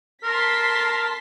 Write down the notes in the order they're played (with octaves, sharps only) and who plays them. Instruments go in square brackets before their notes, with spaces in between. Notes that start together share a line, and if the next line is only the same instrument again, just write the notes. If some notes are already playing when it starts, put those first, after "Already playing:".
[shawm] A#4 [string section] A5 C6 B6